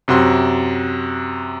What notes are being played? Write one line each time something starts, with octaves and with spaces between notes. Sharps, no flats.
F#2 C3 F#4 C6